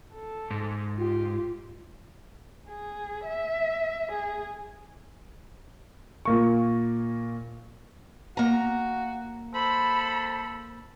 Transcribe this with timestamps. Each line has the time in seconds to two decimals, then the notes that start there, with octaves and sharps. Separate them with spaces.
0.14 A4
0.51 G#2
0.96 F4 G4
2.69 G#4
3.25 E5
4.12 G#4
6.25 A#2 A#3 C#6
8.37 A#3 F#4 A#5
9.54 A4 C5 B5